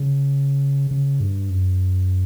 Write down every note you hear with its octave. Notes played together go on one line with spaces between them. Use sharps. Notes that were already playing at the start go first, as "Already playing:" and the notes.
Already playing: C#3
C#3
G2
F#2